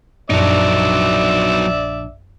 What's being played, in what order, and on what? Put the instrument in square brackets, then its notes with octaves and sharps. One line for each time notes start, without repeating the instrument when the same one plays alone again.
[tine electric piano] A#1 D4 [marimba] F#2 [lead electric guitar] F#3 D#4 [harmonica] D5 E5